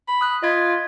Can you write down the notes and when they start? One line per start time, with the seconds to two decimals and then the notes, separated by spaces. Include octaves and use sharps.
0.08 B5
0.21 D#6 F#6
0.43 F4 D#5 G#6 B6